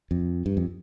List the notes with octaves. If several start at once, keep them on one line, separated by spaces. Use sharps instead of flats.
F2
G2
F2